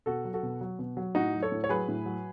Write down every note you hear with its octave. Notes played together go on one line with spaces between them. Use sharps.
B2 F#4 A4
F#3
F#4 A4
B2
F#3
B2
F#3
A2 D#4 F#4
F#3
A4 C#5
A2
C#5
F#3 G#4 B4
A2
F#3